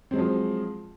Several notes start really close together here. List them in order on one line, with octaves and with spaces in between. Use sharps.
C4 G#3 F#3 F3